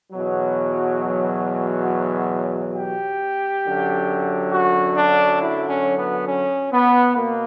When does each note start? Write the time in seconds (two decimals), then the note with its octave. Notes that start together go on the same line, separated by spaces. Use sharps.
0.12 E2 B2 F#3
2.76 G4
3.64 F#2 D3 F#3
4.51 F#4
4.96 D4
5.40 E4
5.69 C#4
5.98 B3
6.28 C#4
6.72 B3
7.16 B2 A#3